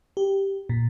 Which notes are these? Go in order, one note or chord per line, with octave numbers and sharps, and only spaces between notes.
G4
A#2